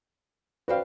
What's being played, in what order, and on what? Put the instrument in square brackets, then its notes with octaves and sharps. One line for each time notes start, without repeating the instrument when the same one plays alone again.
[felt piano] F#4 C5 G5 [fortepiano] B4 D5 F5